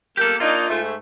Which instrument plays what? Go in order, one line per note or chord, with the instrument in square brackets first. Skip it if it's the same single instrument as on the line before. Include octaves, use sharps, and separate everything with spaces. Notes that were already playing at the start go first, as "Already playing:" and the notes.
[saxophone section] A#3 [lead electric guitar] G4 A4
[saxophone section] A#3 D4 D#4 [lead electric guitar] F4
[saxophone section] G#2 A3